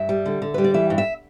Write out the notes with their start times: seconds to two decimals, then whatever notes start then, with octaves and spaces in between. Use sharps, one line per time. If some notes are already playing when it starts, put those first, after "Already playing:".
Already playing: G2 E5
0.09 G3
0.26 D3
0.42 D3
0.54 G3 B4
0.64 D5
0.74 E3 E5
0.90 G2
0.98 E5